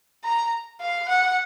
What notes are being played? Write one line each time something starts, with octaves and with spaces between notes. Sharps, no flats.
A#5
F5
F#5